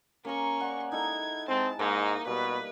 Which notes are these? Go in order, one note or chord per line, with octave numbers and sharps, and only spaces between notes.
A#3 C#4 G#4 A#4 C#6
D5 F#5
D#4 E4 A4 G#6
G#3 C4 A5
G#2 A#3 D#4
B2 G3 B4